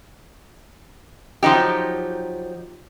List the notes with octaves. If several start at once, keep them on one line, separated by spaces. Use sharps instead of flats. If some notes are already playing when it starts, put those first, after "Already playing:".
F3 F#3 D#4 G4